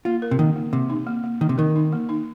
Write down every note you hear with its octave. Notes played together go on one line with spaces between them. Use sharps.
A#3 F4
A#4
C3
D#3 A#3
A#3
C3 A#3
D#4
A#3
A#3
D#3 A#3
C3
D#3 A#4
D#4
A#3
D#4